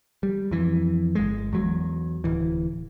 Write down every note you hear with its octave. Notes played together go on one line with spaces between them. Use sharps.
G3
F2 E3
G1 G#3
E2 F#3
D1 E3